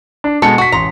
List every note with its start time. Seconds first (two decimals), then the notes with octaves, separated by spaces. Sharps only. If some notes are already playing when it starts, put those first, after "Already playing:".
0.24 D4
0.42 B2 G#3 A4 C#7
0.58 F#4 C#6 B6
0.72 A1 A#5 C6